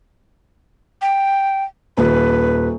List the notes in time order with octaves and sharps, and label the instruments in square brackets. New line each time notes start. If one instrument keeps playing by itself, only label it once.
[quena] G5
[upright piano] D#1 [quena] B4